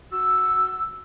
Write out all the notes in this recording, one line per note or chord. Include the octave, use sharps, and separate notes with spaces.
F#4 E6